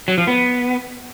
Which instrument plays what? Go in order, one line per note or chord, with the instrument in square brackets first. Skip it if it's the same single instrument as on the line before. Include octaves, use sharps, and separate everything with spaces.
[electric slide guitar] F#3
F3
B3